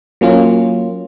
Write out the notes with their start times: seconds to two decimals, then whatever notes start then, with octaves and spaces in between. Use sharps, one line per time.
0.21 F#3 A#3 C#4 F4